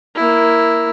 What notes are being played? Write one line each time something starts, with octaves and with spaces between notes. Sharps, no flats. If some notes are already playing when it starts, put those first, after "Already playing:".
A#3 E4